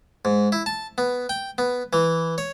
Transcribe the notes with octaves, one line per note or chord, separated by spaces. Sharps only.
G#2
E4
A5
B3
G5
B3
E3
C#5